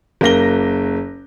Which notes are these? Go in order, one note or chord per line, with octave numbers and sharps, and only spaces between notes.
F#1 A#3 A#6 G7